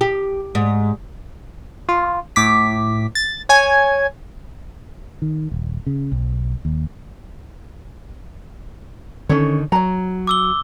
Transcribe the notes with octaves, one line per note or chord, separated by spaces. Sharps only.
G4
G#2
F4
A2 D6 B6
A6
C#5 G#5 G#6
D#3
D#1
C#3
B1
D#2
D3 D#3 C#4 A4 C#5
F#3 C#5 A#5
D6 E6 G7